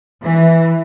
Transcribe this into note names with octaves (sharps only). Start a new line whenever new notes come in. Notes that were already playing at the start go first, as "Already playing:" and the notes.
E3